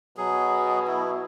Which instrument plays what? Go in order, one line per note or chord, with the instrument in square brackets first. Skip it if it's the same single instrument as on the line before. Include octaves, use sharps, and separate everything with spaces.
[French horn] B2 [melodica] F#3 G#4
[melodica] E4